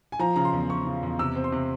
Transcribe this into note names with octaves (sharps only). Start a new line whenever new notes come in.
G#5
F3 A#5
C#3 A#5
C6
E2
E2 C#6
C#3
E2
C3 E6
C4
C6
C3